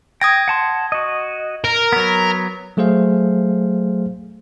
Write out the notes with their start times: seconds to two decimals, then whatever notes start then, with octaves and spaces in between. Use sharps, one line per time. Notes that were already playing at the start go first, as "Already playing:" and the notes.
0.21 G5 D#6 G#6 A#6
0.48 F#5 A5 C6
0.92 F#4 D#5
1.64 A#4
1.92 F#3 B3
2.77 F#3 A3 G#4 C5 F5